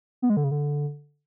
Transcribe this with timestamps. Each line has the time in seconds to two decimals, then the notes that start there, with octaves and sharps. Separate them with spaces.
0.22 B3
0.30 G#3
0.37 D3
0.44 C#3
0.51 D3